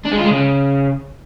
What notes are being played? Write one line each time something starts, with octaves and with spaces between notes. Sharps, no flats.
D4
G#3
F4
G#3
C#3